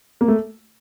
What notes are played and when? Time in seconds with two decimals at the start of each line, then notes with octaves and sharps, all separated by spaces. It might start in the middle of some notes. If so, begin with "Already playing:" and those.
0.21 A#3
0.28 A3